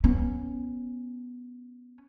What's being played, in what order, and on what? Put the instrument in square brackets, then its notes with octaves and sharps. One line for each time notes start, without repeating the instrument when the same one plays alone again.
[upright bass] B3 C#4